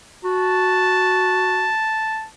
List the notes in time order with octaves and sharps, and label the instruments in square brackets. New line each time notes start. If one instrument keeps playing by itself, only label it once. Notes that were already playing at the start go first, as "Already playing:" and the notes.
[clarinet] F#4 [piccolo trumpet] A5